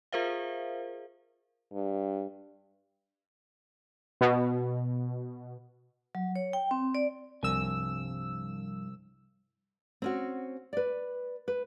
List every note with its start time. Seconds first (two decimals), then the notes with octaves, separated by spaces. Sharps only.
0.12 F4 G#4 A#4 C5 E5 F5
1.73 G2
4.21 B2
6.15 F#3
6.36 C#5
6.53 G5
6.71 C4
6.95 D5
7.43 C2 G2 F3 G#5 E6
10.02 C4 C#4 F#4
10.73 B4 D5
11.48 B4